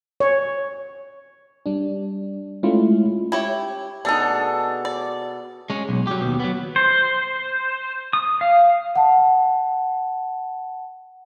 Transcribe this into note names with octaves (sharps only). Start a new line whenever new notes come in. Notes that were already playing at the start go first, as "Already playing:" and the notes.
C#5
G3 D4
G#3 A3 C#4 E4 F4
E4 G4 C#5
B2 D4 D#4 G#4 A4
D5
G#3 C#4
B1
F#3 G4
D#2 B2
F#3 B3
C5
D#6
F5
F#5 A5